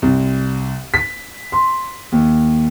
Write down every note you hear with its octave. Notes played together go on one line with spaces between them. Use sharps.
C2
B6
C6
D#2